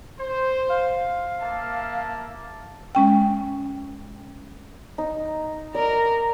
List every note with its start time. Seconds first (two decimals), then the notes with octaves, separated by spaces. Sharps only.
0.19 C5
0.70 F5
1.39 A#3 E5 A5
2.95 G#3 C#4 G5
4.98 D#4
5.75 A#4 D5 A#5